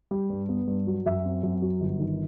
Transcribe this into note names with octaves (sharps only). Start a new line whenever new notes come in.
G3
G2
B3
G2
F#3
F#2 E5
C4
F#2
F#3
G1
D#3